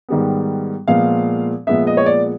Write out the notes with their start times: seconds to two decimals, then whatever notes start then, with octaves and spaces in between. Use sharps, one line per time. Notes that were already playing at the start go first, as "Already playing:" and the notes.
0.09 G#2 D#3 G3 B3
0.88 A#2 F3 G#3 B3 F5
1.67 A#2 F3 G#3 B3 E5
1.87 D#5
1.97 C#5
2.06 D5